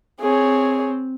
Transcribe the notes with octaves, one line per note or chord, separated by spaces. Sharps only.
C4 G#4 C#5